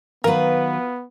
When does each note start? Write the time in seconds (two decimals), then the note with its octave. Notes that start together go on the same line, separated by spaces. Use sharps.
0.24 D#3 F#3 B3 F4 F#4 A#4 B4